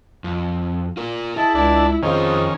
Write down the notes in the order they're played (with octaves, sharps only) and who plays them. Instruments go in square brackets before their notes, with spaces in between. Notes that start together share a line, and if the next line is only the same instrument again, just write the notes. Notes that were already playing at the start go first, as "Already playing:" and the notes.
[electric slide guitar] F2
F4 A#4
[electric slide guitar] E4 [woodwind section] G#4 D#5 A5
[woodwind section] C#2 [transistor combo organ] D4
[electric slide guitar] F2 F4 [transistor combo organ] D#3 C#4 [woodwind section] G#4 C5 D#5